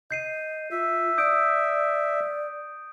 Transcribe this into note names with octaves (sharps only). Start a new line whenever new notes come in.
D#5 G6 C7 D#7
F4 E5
D5 D#6 G6 D7